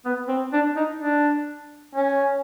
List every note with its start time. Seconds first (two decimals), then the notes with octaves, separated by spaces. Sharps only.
0.05 B3
0.28 C4
0.53 D4
0.76 D#4
1.00 D4
1.95 C#4